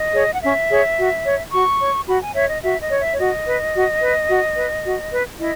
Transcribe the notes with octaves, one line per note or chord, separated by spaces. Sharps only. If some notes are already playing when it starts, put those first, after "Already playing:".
Already playing: D#5
G#4 C#5
F#5
C#4 E5
G#4 C#5
F#4
C#5
F#4 C#6
C#5
F#4 B5
G#5
C#5 E5
D#5
F#4 E5
D#5
C#5
E5
C#5
F#4 D#5
B4
F#4
B4
F#4
B4
F#4
B4
E4 D#5